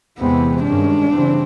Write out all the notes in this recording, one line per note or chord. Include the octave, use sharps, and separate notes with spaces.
E2 C3 E3 G#3 B3 C4
G2 D#3 G#3 C#4 D4
C#3 E3 G3 C4